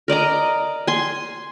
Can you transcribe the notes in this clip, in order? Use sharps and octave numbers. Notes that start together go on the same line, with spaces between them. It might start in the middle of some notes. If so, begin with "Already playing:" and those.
A#4 D5 D#5 A#5
G#5 C6